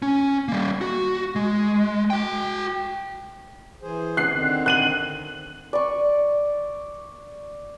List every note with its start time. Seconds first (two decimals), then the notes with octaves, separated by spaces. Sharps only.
0.02 C#4
0.48 G3 A#3
0.81 F#4
1.36 G#3
2.10 F#4 G5
3.82 E3 G#4 C5
4.17 F#6 C7
4.32 D3 D#3 C4
4.66 F#6 D#7 F#7
5.73 D5 C#6